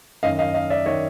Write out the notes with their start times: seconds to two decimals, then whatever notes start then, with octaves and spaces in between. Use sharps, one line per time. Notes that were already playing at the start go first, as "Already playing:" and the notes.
0.23 F#2 D#3 D#5 F5
0.39 D#5 F5
0.54 D#5 F5
0.70 D5 E5
0.86 D#3 C#5 D#5